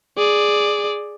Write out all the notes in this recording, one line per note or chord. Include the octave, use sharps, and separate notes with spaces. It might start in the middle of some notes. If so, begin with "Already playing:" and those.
G#4 D5